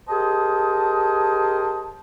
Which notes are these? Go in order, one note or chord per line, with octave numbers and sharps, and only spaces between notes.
G4 G#4 A#4 C5 D#5 A5